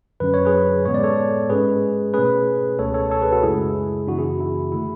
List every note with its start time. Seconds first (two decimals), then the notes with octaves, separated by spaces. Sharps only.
0.20 F#2 D3 F#3 C#4 B4
0.34 C#5
0.45 G#4 B4
0.85 A2 G#3 B3 C#5
0.94 D5
1.04 A4 C#5
1.50 G#2 G#3 C#4 G#4 B4
2.14 B2 A3 C#4 G#4 B4
2.79 C#2 B2 A3 C#4 A4 C#5
2.94 A4 C#5
3.10 A4 C#5
3.22 G#4 B4
3.32 F#4 A4
3.43 F#2 C#3 G#3 E4 G#4
4.07 F#2 C#3 E3 B3 D4 F#4
4.19 E4 G#4
4.40 E4
4.72 D3 A3 E4